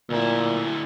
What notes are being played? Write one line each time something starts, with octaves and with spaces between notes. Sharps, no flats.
D2 A#2 E4